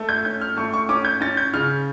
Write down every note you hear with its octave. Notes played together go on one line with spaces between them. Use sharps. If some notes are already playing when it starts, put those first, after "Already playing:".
Already playing: A3
G6
C#4 G6
F6
A3 C#6
C#6
C#4 D6
G6
C#4 A6
G6
C#3 F6